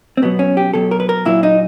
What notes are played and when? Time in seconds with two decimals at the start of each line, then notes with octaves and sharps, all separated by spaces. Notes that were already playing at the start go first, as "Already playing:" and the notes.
0.17 C4
0.22 B2 F#3 B3
0.39 C#4
0.57 G4
0.74 B2 F#3 A4
0.91 A#4
1.00 B4
1.09 A#4
1.25 A#2 F#3 E4
1.43 D#4